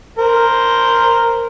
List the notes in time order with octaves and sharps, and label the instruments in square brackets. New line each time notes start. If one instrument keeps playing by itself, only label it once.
[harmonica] A#4 C5